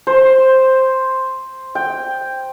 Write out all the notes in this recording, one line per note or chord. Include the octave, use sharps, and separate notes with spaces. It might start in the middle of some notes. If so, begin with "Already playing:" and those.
C5
G5